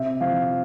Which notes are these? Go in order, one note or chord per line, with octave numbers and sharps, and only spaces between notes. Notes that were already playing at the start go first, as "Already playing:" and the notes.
Already playing: C3 E5
F3 F5